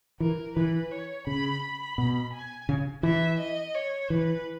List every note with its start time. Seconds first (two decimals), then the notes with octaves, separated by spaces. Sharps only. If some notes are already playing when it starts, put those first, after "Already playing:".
0.20 E3 A#4
0.56 E3 B4
0.91 C#5
1.27 C#3 B5
1.62 B5
1.98 B2
2.33 G#5
2.69 C#3
3.03 E3 E5
3.39 D#5
3.75 C#5
4.10 E3 B4